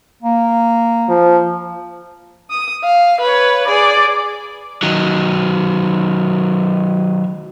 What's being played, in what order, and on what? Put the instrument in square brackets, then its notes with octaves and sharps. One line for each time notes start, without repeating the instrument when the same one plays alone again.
[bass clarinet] A#3
[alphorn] F3
[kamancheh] D#6
F5
B4 C#5
G#4 D5
[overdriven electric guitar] D#3 F#3